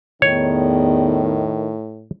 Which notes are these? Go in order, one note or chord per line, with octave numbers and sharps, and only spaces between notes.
E2 A2 D#3 C#5